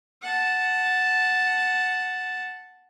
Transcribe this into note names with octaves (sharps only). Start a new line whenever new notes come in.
F#5 A5